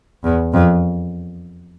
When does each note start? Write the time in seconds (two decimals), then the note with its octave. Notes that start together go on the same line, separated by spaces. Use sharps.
0.24 E2
0.54 F2